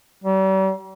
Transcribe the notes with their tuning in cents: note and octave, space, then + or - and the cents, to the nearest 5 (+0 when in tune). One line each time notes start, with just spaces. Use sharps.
G3 -40